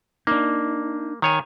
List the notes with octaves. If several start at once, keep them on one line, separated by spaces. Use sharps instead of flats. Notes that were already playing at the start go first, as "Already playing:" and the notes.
A#3 D4 D#4
D#3 C#5 G#5